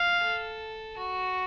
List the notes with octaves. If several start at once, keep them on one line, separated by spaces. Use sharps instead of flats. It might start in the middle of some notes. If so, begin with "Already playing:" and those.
Already playing: F5
A4
F#4